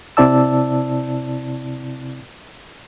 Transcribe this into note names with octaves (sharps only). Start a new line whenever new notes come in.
C3 C4 E4 D5 A5 E6